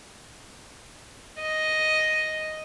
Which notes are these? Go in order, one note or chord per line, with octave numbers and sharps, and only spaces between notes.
D#5